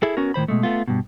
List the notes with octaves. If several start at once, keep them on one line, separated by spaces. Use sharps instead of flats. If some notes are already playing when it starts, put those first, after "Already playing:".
E4 G#4 A4
B3 C#4 F#4 A#4
A2 D#3 C5 B5
B2 G#3 A3
A3 B3 F4
G2 B2